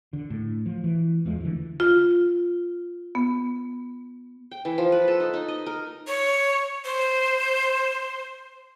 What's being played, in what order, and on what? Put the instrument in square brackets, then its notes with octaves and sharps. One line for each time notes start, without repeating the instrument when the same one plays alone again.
[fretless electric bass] D3
A2
F3
E3
D1 E2 F3 G#3
D3 E3
[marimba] F4
B3
[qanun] G5
E3
F3
B4
A4
D#4
D#4
D#5
A#4
[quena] C#5
C5